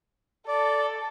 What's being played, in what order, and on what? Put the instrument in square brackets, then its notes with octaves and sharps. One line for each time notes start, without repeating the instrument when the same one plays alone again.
[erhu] A4 [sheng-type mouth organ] D5